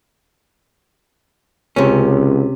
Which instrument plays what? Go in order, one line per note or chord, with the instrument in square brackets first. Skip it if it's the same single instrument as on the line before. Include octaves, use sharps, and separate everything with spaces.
[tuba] C#2 [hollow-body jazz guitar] C3 C#4